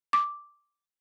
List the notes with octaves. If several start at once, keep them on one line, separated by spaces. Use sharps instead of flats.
D6